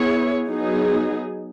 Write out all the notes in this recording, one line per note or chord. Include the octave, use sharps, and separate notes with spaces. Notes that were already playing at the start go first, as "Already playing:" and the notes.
Already playing: B3 E4 G#4 C#5
F#3 B3 D#4 G#4